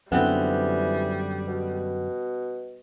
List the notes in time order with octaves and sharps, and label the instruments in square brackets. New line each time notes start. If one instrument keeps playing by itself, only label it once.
[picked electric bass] F#2 D3 [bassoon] E3 [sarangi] G3 [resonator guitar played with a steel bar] B3 C4
[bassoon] B2